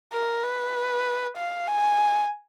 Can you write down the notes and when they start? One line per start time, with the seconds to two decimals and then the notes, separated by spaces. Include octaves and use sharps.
0.13 A#4
0.43 B4
1.37 F5
1.68 G#5